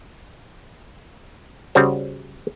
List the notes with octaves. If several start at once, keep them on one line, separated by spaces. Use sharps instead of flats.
C#3 G3 F#4 C5